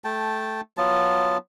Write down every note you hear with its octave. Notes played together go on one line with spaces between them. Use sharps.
A3 G5 A5
F#3 B3 F4 A5